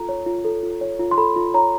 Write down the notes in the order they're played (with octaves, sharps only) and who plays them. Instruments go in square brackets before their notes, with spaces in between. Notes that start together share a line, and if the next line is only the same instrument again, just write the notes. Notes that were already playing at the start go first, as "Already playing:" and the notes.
Already playing: [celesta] F4 A4 A#5
C#5
F4
A4
F4
C#5
F4
C6
A4 B5
F4
C#5 A#5